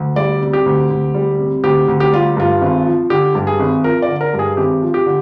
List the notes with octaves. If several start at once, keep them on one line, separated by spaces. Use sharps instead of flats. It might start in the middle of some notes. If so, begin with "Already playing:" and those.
Already playing: D2
G3 D5
C3
G4
D2
D2
G3
C3
D2 G4
D2
G4
G3 F4
G2 F4
G#1
F3
D3 G4
G2
G#4
G#1
F3 A#4
D5
D3
A#4
G2
G#4
G#1 G4
F3
G4
D3